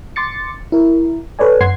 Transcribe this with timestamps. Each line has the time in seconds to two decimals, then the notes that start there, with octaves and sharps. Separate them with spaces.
0.16 C6 D6 A6 C#7
0.72 E4 A#4
1.39 A4 B4 C#5 D5 G#5
1.61 F#2 F#5 C6 G#6 C7